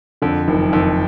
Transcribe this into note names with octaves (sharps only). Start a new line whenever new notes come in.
F2 D3
F#1 D#3
F2 D#3